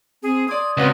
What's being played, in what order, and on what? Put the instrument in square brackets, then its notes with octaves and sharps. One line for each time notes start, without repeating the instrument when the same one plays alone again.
[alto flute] C4 [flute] G#4
[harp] D5 D#6 [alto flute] C6 [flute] G#6
[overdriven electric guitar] C#2 [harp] C4 F#4 D#5 [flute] B4